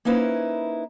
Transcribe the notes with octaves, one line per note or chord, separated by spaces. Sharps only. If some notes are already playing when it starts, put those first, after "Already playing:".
A#3 C#4 D#4 E4 B4 C5